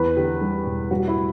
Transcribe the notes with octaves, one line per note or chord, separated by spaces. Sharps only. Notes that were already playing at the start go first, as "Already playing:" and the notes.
Already playing: E2 B4
D3 G4
G3
E1
G3 F#4
E4
A2